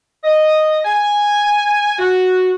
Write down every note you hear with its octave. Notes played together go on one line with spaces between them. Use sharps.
D#5
G#5
F#4